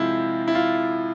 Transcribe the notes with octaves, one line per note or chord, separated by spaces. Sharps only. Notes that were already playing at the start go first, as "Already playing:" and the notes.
Already playing: C3 F3 G#3 E4 F4
E4
F4